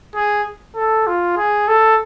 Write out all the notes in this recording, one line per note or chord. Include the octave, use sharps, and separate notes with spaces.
G#4
A4
F4
G#4
A4